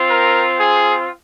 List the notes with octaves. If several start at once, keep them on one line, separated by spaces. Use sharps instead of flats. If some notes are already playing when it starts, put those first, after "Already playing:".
Already playing: C4 F4
A#4
G#4